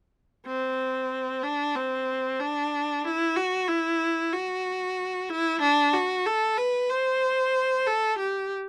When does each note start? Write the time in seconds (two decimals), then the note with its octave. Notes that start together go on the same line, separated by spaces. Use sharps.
0.46 C4
1.43 D4
1.75 C4
2.40 D4
3.04 E4
3.36 F#4
3.68 E4
4.33 F#4
5.29 E4
5.61 D4
5.93 F#4
6.26 A4
6.58 B4
6.90 C5
7.87 A4
8.19 G4